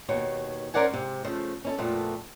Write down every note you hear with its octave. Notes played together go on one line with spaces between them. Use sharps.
D#2 B2 C#5
C#4 A#4 C5 D5 F#5 G#5
G#2 C3
C#3 F3 A3
C#4 E4 A4
F2 A#2 A3 B3